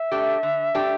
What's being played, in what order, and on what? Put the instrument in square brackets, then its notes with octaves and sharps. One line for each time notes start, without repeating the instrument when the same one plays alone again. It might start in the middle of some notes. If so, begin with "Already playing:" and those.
Already playing: [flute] E5
[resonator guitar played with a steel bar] A3 D4 G4
D3
A3 D4 G4